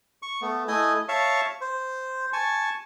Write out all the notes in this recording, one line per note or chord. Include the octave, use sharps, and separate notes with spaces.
C#6
A3 B3
A3 E4 D#5 G#5 D#6
C#5 E5 F5 A5 C#6
C5
G#5 A5 C#6